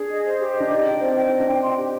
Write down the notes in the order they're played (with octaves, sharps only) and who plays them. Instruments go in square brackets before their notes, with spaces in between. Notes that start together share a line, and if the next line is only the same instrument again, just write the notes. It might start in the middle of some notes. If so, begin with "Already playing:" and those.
Already playing: [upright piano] D4 [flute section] G#4
[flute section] D#5
C5
G4
D#5
[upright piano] D4
[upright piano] D#4 [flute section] D5
[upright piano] D4 [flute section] G5
[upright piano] C4 [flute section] D5
[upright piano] D#4 [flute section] G5
[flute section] D#5
[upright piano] D4
[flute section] G5
C6
G4